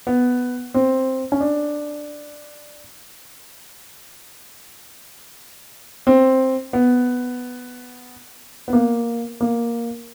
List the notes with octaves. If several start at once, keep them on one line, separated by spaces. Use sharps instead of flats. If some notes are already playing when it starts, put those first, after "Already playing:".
B3
C4
C#4
D4
C4
B3
B3
A#3
A#3